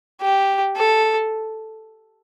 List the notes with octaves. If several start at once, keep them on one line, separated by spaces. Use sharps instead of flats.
G4
A4